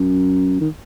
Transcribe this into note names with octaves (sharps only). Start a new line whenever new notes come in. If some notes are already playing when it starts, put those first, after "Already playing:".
Already playing: F#2
D#3